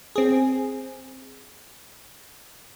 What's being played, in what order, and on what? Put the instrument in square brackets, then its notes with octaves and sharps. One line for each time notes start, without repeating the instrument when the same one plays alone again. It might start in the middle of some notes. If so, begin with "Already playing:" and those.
[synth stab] C4 G#4